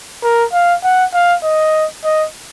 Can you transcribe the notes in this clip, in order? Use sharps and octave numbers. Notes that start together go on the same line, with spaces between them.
A#4
F5
F#5
F5
D#5
D#5